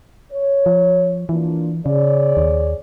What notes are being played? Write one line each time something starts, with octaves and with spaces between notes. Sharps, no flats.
C#5
F3
E3 A#3 D4 F4
C#3 G#4 C#5 D5
D#2